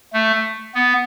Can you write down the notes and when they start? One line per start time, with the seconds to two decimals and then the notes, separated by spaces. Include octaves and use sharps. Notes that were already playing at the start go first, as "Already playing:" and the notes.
0.13 A3
0.75 B3